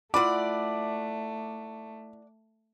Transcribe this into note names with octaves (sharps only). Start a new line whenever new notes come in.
A3 E4 F4 D5 F#5 B5 D6